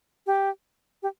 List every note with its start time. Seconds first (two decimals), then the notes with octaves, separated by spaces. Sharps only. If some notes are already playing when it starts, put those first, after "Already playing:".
0.27 G4
1.03 G4